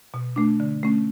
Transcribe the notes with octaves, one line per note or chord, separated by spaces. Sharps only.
B2
A3 D4
D3
A3 C#4